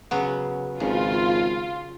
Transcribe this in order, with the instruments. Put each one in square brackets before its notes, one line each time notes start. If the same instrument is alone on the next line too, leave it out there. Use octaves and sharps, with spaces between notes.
[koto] C#3 F#3 B3
[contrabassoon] G#1 [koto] C#3 [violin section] F4